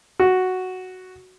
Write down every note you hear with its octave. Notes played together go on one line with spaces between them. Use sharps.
F#4